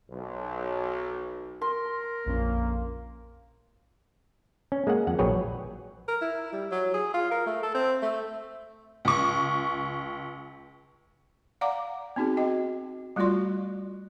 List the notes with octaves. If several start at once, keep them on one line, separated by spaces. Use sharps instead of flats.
B1
A#4 C6
A#1 F2 A#3 C#4
C#4
G#3 A#3 G#4 F#5
F2 F#5
A#1 F#3 G#4 B4 C#5 G5
A#4
E4
G3
F#3
G#4
F4
A#4
A3
A4
C4
A3
C#2 C#6
D5 F5 F#5 A#5 D6
B3 C4 D#4 F#4 G#4
F#4 D#5 G5
G3 A3 F4 F#4 D5 C6